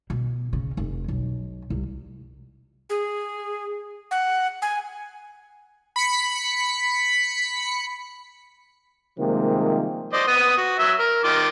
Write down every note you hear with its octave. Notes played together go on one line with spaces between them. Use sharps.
B2
C#3
F1
B1
C2
G#4
F#5
G#5
B5 B6 C#7
C3 D#3 F3 G3 G#3 A#3
C5 D5 D#5
B3 D#6
F#4
F#3 E5
A#4
D#3 F4 D6